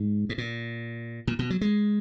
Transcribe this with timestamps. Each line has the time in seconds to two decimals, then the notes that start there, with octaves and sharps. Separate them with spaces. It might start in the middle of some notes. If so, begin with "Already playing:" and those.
Already playing: G#2
0.29 G#2
0.38 A#2
1.27 A#2
1.39 B2
1.50 F#3
1.61 G#3